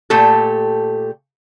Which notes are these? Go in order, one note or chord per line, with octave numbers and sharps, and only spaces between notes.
A#2 A3 G4 A4